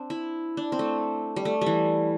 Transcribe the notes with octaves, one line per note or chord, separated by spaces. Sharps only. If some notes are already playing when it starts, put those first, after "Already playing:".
Already playing: C4 D4
E4
D4
C4
A3
G3
A3
E3 G3